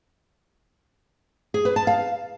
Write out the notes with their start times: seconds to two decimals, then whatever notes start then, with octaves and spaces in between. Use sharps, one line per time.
1.54 G#4
1.65 B4
1.76 A5
1.87 F5